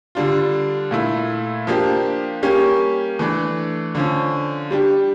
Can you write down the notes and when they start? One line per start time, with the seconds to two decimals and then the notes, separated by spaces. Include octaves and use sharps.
0.15 D3 G3 D4 F4
0.91 A#2 A3 E4
1.67 F3 A#3 D4 G4
2.43 G3 A#3 C#4 G4
3.19 E3 A3 D4
3.95 D3 F3 C#4
4.71 G3 D4 G4